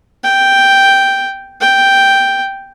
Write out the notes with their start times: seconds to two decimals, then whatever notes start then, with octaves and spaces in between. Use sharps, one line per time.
0.24 G5
1.61 G5